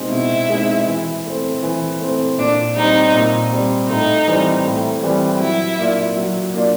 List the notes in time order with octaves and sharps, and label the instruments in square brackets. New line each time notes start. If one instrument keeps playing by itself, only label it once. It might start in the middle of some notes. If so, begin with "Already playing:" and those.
Already playing: [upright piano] B2 G#3 C4 D#4
[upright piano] B2 [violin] E4
[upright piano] G#3 C4 D#4
E3
A3 C4
E3
A3 C4
[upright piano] A#2 [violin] D4
[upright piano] G3 C4 [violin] D#4
[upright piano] A#2
G3 C4
[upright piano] A2 [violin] D#4
[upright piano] E3 G3 C4
A2
E3 G3 C4
[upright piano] F#3 [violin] E4
[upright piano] A#3 D4 F4
F#3
A#3 D4 F4